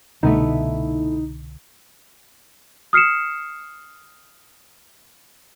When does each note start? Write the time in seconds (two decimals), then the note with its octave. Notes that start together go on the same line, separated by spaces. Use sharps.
0.23 C2 B2 D3 A3 B3 D#4 E4
2.93 D#6 F6 C7 C#7 E7